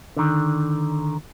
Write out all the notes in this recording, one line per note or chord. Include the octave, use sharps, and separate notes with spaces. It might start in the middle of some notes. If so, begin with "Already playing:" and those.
D3 D#3